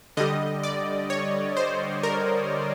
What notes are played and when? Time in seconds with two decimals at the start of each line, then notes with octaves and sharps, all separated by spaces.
0.17 D3 G3 D#5
0.63 D5
1.10 C#5
1.57 C5
2.03 A#4